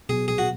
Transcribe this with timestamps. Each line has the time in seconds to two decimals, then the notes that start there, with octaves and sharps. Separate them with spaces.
0.09 B2 F#3 B3 G#4
0.28 G#4
0.38 F#4